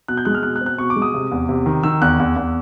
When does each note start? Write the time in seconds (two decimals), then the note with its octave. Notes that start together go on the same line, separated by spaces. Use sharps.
0.08 B2 F#6
0.17 G6
0.25 G#3 F#6
0.35 F6
0.43 B2 F#6
0.56 F#6
0.61 C4
0.66 F#6
0.78 B2 C#6
0.90 D6
0.96 G#3
1.02 D#6
1.14 C3
1.32 E2
1.49 C3
1.66 D#3
1.83 D#3 E6
2.02 E2 F#6
2.20 E2
2.36 E2